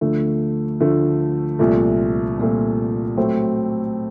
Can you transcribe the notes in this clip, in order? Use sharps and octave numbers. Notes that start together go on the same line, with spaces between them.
D2 D3 F3 A3
D2 D3 F3 A3
C2 A#2 F3 A3
C2 A#2 F3 A3
A2 F#3 A3 C4